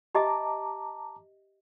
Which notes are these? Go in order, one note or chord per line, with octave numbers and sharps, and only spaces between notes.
G4 D#5 E5 A5 A#5 D6